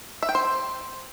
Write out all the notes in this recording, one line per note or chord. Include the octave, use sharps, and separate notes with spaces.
E5
G5
C5